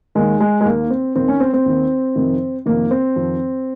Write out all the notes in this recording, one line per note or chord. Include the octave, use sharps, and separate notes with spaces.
D#2 D#3 G#3
G#3
G#3
D#2 D#3 A#3
C4
D#2 D#3 C4
C#4
C4
C4
D#2 D#3
F2 C3 D#3
F2 C3 D#3 A#3
C4
F2 D#3